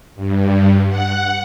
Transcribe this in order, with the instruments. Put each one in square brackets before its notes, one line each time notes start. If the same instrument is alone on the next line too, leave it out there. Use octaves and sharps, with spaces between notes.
[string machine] G2
F#5